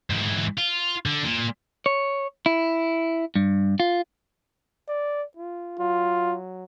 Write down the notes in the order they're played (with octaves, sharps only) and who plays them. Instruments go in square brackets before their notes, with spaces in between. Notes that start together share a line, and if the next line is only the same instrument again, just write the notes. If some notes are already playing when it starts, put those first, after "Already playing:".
[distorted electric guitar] G#2 E3
F4
D3
A#2
[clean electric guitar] C#5
E4
G2
F4
[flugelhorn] D5
F4
[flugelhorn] F#3 [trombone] F4